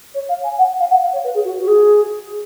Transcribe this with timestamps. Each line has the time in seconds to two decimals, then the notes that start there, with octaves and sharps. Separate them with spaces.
0.14 C#5
0.29 F5
0.43 G#5
0.58 F#5
0.79 F5
0.90 F#5
1.02 F5
1.12 C#5
1.24 B4
1.34 G#4
1.44 F#4
1.59 F#4
1.67 G#4